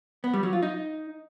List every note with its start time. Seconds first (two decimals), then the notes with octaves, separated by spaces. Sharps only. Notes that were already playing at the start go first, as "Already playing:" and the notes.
0.24 B3
0.33 G3
0.43 F#3
0.53 F4
0.63 D#4